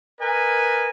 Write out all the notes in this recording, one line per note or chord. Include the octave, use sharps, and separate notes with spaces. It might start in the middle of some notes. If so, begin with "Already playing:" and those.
A#4 B4 D#5 G#5